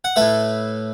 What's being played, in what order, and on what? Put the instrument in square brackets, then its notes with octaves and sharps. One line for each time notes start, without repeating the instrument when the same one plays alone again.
[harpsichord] F#5
A2 A3 B4 E5